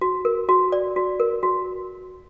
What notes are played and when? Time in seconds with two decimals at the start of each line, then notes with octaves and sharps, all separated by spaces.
0.01 F#4
0.25 A#4
0.49 F#4
0.72 D5
0.96 F#4
1.20 A#4
1.43 F#4